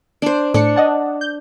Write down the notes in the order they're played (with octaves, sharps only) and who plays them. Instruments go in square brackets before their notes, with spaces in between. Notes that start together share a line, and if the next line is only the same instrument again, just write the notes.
[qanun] D4 C5
[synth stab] A2 C#7 [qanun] D4
[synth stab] D#5 F#5 A5
G6